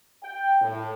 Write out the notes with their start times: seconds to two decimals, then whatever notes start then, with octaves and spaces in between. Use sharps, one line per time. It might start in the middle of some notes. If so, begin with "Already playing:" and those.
0.23 G5
0.62 A2